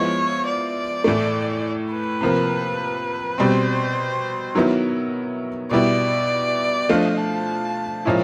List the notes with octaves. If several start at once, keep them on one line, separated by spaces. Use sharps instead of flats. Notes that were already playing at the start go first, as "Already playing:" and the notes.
Already playing: F3 G#3 B3 E4 C#5
D5
A2 E3 A3
B4
C3 F3 A#3
B2 G3 C4 C5
D#3 F#3 B3 E4
B2 G3 B3 E4 D5
F3 A3 D4 F4 D#5
A5
A#2 F3 G#3 C#4 E4